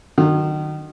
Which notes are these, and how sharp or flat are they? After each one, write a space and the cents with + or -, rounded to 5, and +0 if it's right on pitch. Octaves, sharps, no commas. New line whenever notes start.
D#3 -30 F#3 +5